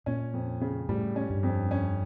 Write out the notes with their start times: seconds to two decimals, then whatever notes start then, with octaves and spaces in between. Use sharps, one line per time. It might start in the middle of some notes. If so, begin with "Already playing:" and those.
0.06 A#2 C#4
0.34 F2
0.61 C#3
0.89 A2 G3
1.16 C#4
1.30 G2
1.43 F2
1.71 C#4